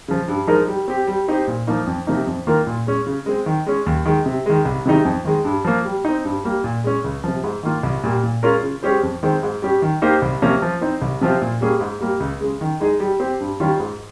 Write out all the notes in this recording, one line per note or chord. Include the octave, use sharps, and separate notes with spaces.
C#3 F3
G2
F3 G#3 D#4 A#4
G3
C4 G4
G3
C4 D#4 G4 C5
A#2
F3 A#3 D#4
F2
C3 F3 A#3 D#4
F2
D#3 A#3 F4 A#4
A#2
G#3 C#4
C#3
G#3 C4
D#3
G#3 C#4
D#2
D#3 G#3
C3
D#3 G#3
C2
C3 D#3 G#3 D#4
F2
D#3 G#3
G2
F3 A#3
G3
C4 D#4
G2
G3 A#3
A#2
G#3 C#4
C#2
C3 F3
G#2
D#3 A#3 F4
C2
A#2 G3 A#3
A#2
G#3 C#4 F4 A#4
C#3
G#3 C#4 G4 C5
F2
D#3 G#3 C4
G#2
G3 C#4 G4
D#3
A#3 D#4 G4 C5
C2
C3 F3 A#3 C#4
F3
C4 D#4
C2
C3 F3 C4 F4
A#2
G3 A#3 C#4 G#4
G#2
G3 A#3
C#2
C#3 G#3
D#3
G#3 D#4 G#4 D#5
G3
C4 G4
G2
D#3 G3 C#4 F4
G#2